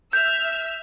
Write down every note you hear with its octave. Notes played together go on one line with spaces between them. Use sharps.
E5 E6 F6 G6